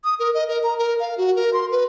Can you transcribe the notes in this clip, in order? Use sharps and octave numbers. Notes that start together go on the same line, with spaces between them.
D#6
A#4
D#5
A#4
A#5
A#4
F5
F#4
A#4
C6
B4